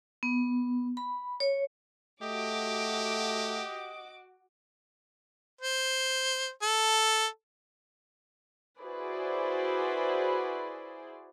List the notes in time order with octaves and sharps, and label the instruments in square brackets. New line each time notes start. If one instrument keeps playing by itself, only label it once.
[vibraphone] B3
B5
C#5
[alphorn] A3 [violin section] F#4 D6 [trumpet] G4 [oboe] D#5
[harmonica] C5
A4
[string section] E4 F#4 G#4 B4 C5 D5